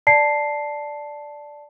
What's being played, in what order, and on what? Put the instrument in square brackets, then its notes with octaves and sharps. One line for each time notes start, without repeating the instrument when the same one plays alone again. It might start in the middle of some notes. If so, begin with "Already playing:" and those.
[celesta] D5 A5 C7